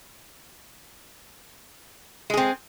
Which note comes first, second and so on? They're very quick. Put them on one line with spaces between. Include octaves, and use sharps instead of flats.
G#3 G#4 C4